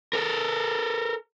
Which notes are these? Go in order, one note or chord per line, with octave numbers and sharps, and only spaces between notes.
A4 A#4